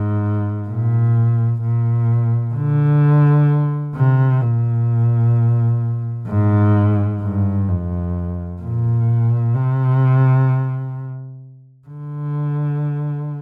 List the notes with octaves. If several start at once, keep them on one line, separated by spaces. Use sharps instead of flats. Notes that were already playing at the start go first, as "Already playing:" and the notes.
Already playing: G#2
A#2
A#2
D3
C3
A#2
G#2
G2
F2
A#2
C3
D3